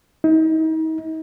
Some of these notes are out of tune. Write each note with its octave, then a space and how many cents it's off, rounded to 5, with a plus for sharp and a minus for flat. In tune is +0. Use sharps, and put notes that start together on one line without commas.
D#4 +40